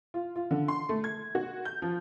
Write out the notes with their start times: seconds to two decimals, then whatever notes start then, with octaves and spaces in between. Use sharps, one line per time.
0.14 F4
0.36 F4
0.51 D3
0.68 C6
0.89 A3
1.04 G#6
1.35 F#4
1.65 G6
1.82 F3